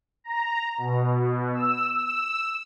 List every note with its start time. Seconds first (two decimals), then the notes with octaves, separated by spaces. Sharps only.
0.24 A#5
0.78 B2
1.54 E6
1.95 E6